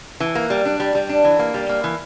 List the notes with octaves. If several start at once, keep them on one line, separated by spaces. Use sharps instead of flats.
E3
A#3
G3
D4
G3
G3
D4
E3
A#3
G3
A#3
E3